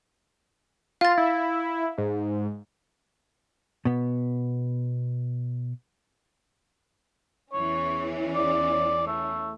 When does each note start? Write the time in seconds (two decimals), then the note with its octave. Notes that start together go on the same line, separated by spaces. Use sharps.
1.01 F4 F5 A6
1.18 E4
1.98 G#2
3.85 B2 B3
7.53 E2 E3 C#4 C#5
8.35 D5
9.07 A3